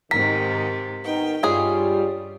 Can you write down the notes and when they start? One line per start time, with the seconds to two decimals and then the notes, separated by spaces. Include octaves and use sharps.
0.11 G#2 C3 D#3 A#4 B6
1.05 D#3 B3 D#4 G5
1.43 G2 G3 G#3 C#4 F4 G#4